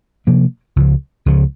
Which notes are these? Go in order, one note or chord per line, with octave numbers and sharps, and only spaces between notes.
C3 F3 A#3 D4
C#2 C#3 F3
C#2 C#3 F3